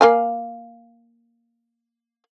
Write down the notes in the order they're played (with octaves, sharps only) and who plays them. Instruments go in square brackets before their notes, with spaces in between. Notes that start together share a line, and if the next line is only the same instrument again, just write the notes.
[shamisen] A#3 F5 G#5